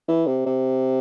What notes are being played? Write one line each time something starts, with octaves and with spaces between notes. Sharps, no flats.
E3
C3
C3